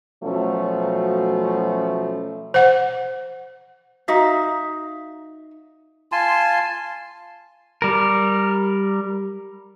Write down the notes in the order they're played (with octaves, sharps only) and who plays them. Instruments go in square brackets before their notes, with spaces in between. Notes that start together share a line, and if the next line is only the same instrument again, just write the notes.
[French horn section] B2 F3 F#3 A3 C#4
[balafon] C5 F#5
[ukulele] D#4 F#4 E5 F5
[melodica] F4 G#5 A5 C6
[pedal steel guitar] G3 A#4